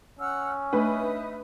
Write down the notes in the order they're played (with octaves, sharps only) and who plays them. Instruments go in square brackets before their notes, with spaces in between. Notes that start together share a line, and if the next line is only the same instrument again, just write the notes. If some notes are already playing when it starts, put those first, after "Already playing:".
[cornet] C#4 [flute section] F#5 E6 F6
[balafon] A3 D4 [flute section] D#4 E5 D#6 [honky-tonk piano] B4